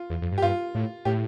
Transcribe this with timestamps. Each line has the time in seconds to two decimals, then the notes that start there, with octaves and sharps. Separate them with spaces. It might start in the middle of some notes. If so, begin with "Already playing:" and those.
Already playing: F4
0.10 E2
0.22 F2
0.32 G2
0.38 G4
0.42 G2 F4
0.75 A2
1.05 A2 G4